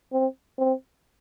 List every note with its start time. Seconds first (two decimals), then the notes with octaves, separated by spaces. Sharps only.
0.12 C4
0.58 C4